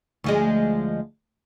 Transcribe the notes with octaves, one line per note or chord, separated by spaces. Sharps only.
D2 F3 G#3